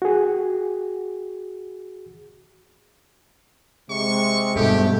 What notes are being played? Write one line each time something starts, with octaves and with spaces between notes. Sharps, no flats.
F#4 G#4
C3 G#3 C#6
G2 B2 A3 G4